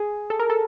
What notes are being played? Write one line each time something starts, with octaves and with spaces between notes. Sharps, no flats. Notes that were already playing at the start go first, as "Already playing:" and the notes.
Already playing: G#4
A4
A#4
A4